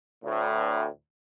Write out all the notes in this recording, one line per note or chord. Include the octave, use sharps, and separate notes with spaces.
D2 A2